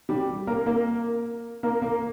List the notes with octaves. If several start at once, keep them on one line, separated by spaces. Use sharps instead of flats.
G3 G4
A#3 A#4
A#3 A#4
A#3 A#4
A#3 A#4